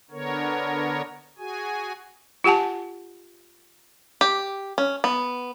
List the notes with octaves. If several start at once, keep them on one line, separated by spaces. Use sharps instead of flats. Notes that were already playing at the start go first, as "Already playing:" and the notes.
D3 B3 A#4 C#5
F#4 G#4 G#5
F4 G4 F#5 G#5 A5
G4
C#4
B3